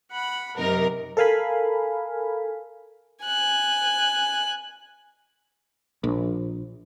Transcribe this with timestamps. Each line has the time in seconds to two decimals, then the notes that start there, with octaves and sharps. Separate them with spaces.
0.11 F#5 B5
0.57 F#2 C3 D#4 A#4
1.17 A4 A#4 F5 G#5 B5
3.24 G#5 F#6
6.04 A#1